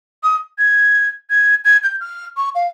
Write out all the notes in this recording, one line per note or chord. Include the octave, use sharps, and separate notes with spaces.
D#6
G#6
G#6
G#6
G6
F6
C#6
F5